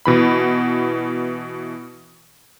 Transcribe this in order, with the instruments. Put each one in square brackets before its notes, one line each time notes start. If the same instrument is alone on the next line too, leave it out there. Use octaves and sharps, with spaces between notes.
[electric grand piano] B2 E3 B5